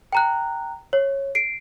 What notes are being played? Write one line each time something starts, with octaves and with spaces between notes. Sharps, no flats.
G5 A#5 F#6
C#5
C7 D7